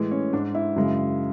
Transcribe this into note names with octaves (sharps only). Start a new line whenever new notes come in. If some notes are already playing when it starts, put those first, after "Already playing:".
Already playing: A2 E3 G#3
C#4
G#2 G#3 D4
E4
F#2 C#3 G#3